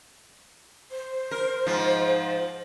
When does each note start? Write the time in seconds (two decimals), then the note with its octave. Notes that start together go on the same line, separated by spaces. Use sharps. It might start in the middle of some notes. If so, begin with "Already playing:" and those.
0.91 C5
1.31 A#4
1.66 G#2 F3